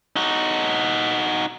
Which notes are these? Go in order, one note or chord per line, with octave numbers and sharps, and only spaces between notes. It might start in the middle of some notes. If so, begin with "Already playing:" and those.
D#4 F#4